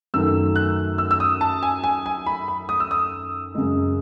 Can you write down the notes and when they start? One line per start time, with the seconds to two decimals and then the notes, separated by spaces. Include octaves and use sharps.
0.14 F#2 D#3 F#3 A3 E6
0.56 F#6
0.98 E6
1.11 E6
1.20 D#6
1.41 A5
1.63 G#5
1.84 G#5
2.06 G#5
2.26 B5
2.48 B5
2.69 D#6
2.80 E6
2.91 D#6
3.55 F#2 C#3 G#3